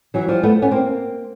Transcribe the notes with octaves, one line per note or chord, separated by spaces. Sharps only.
E3 F#3
F3 G3
A3 B3
B3 C#4
A#3 C4